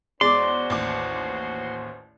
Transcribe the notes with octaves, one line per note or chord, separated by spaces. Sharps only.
E2 G#3 C#4 F#4 C5 D5 C6
A1 D#2 D6